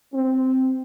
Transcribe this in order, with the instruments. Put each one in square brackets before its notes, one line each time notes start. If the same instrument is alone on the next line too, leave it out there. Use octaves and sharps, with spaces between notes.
[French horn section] C4